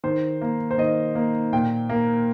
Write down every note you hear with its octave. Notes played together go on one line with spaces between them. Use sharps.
D#3 C5
A#3
C5
D#3 D#5
A#3
A#2 G5
A#3